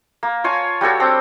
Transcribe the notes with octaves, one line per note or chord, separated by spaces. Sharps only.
A#3
F4 C#5 G#5 A5
G3 F#4 A4 C#5
C4 D4 G5